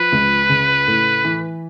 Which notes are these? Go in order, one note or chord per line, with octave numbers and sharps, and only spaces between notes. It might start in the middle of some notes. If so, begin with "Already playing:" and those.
Already playing: F3 B4
C#2
C#3
A2
E3